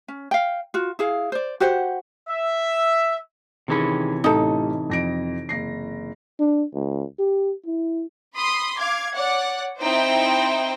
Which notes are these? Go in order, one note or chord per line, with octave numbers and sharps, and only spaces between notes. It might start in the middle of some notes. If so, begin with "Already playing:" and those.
C#4
F5 G5
F4 F#4
E4 G#4 F5
C5 D5
F#4 G4 C5 F#5
E5
C3 D#3 E3 C#4 G#4 B5
A1 D#4 G4 A4 D#5
F2 A#6 D7
F#1 A#6 C7
D4
C#2
G4
E4
B5 C6 D#6 C7
F5 D6 G#6
C#5 D5 F#5
C4 D#4 E4 C5 G5